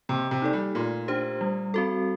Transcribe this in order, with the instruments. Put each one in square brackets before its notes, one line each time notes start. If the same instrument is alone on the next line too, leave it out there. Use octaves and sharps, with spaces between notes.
[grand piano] C3 [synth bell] A#3
[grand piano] C3
[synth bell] D#4 A4 D5
[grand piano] G3
[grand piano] A#2 [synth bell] A3
[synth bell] D4 G4 C5
G3
C4 F#4 A4